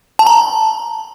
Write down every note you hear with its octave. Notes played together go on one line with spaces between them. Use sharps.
A5
A#5